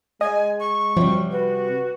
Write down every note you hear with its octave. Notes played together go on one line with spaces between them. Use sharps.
G#3 D#5 G#5
C#6
C3 F3 G3 F#4 C#5
F#4 B4